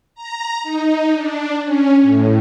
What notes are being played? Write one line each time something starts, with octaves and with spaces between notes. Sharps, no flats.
A#5
D#4
D4
C#4
A2